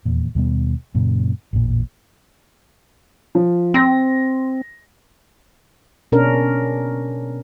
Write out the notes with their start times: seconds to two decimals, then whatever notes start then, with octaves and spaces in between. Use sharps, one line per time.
0.05 D#1 E2 A#2
0.35 D#2 B2 G3 B3
0.95 F#2 A#2 C#3
1.53 A1 E2 A#2
3.35 F3
3.74 C4 C6 A#6
6.12 B2 C#4 D4 A#4